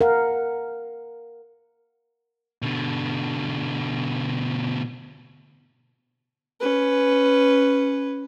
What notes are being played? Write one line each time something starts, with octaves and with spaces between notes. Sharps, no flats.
A#4 F5 F#5
B2 D3
C#4 B4